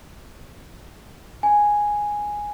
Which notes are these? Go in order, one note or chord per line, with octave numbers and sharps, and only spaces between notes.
G#5